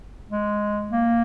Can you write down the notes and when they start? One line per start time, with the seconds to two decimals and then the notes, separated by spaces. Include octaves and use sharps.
0.31 G#3
0.91 A#3